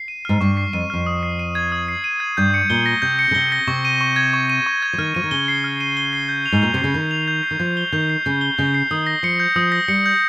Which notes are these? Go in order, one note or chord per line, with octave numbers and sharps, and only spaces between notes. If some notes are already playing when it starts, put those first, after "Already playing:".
Already playing: C7
D#7
G#2 F6
G2 C#6
C7
F2 D#7
F2 F6
D#6
C7
D#7
G#6
D#6
C7
D#7
G#6
G2 G6
C#7
A#2 G7
A#6
C3 G6
C#7
C#3
C3 G7
A#6
C3 C#6
D#7
C#6
G#6
C#6
D#7
C#6
G#6
F3
D#3 F6
F3 D#7
D#3
C#3 G7
C7
F6
D#7
G7
C7
G6
F7
G#2
A#2 G6
C3 C7
C#3
D#3 G6
F7
G6
C7
D#3
F3 G6
G7
D#3 G6
C7
C#3 G6
G7
C#3 G6
C7
D#3 D#6
A#6
F3 C#7
G6
F3 D#6
A#6
G3 C#7
G6